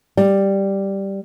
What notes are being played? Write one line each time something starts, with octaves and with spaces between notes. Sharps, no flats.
G3